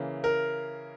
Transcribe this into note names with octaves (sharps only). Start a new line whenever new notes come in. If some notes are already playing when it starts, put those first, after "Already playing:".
Already playing: C#3 E3 A#3
A#4